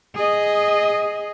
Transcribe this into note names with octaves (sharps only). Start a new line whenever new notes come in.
G#4 D#5